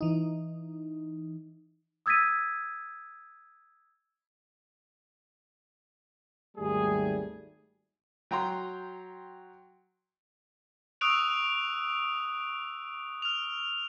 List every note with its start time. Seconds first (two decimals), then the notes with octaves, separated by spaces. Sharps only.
0.01 E3 D#4
2.06 D#6 E6 G#6 A6 B6 D#7
6.57 G#1 D#2 G3 A3 G#4
8.31 F#3 G5 A#5 C6
11.01 C#6 D#6 E6 F#6 D7 F7
13.22 F6 F7